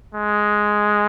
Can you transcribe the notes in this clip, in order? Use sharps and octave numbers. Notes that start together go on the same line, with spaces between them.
G#3